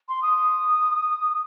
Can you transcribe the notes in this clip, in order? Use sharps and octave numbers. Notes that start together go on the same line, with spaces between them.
C6
D#6